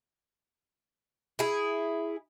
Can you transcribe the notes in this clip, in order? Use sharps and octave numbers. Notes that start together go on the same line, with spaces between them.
E4 G#4